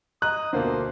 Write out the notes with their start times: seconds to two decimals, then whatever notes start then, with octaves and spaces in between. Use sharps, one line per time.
0.22 D#5 A#5 D#6 F#6
0.53 D2 B2 D3 A#3 F4 C5